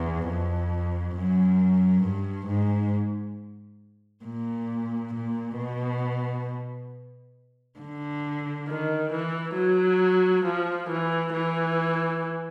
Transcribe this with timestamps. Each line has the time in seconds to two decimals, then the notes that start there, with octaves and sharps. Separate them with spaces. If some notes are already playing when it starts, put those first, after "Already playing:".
Already playing: E2
0.26 F2
1.15 F#2
2.04 G2
2.47 G#2
4.24 A#2
5.14 A#2
5.58 B2
7.79 D3
8.67 D#3
9.12 E3
9.56 F#3
10.44 F3
10.89 E3
11.33 E3